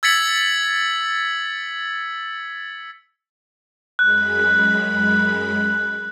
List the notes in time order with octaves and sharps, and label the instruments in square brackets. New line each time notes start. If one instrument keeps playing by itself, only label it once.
[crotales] E6 G#6 A6 B6 C#7 F#7
[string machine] F#2 G#3 B5 [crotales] F#6